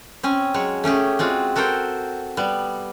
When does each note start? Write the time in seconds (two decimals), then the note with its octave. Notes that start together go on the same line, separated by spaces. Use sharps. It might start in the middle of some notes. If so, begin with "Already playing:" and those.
0.23 C4 C#4 G#5
0.54 F#3 G#3 C#5
0.84 A3 C#4 G4 G#4
1.19 G#3 C4 F4 F#4
1.56 F#4 A4 A#4 C5 G5
2.37 G3 B3